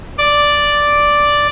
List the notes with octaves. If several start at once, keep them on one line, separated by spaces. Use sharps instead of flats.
D5